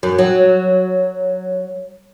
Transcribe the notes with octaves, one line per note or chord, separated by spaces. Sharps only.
F#2
F#3